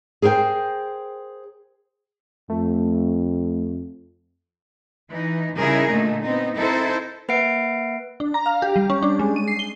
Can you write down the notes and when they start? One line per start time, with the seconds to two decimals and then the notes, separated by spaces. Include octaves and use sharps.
0.22 G#4 A#4 C5 E5 G5
2.50 F2 A3
5.09 E3 D#4
5.57 C#3 G3 D#4 E4 G#4 A#4
5.89 A#2 D3 A3 D#4
6.23 B3 C4 D#4
6.55 C4 D#4 E4 A4 A#4 C5
7.29 A#3 B4 E5 F#5 C7 D7
8.20 D4
8.34 A#5
8.46 F5
8.62 G4
8.76 G3
8.90 C#4
9.03 D4
9.19 G#3
9.36 D#7
9.48 C7
9.59 G7